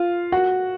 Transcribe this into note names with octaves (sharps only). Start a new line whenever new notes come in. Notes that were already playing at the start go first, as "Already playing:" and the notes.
Already playing: F4 F5
F#4 F#5